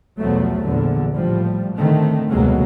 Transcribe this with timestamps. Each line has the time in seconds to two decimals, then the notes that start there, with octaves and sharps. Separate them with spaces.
0.21 B1 E2 F3 F#3 A3
0.64 A#1 E2 D3
1.14 A2 F3 G3
1.77 D3 D#3 A3 C4
2.30 F1 D2 B2 F#3 G#3 A#3